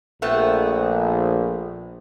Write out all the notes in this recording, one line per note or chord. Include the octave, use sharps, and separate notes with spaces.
A#1 A3 B3 C4